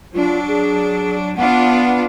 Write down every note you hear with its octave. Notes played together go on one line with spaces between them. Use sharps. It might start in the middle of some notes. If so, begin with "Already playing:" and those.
F#3 D4 F4
G#4
B3 D4 F4 F#5